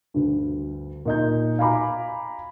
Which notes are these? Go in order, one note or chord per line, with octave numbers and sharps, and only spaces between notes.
D2 G2
A#2 D#4 G6
F5 G#5 A#5 B5 D6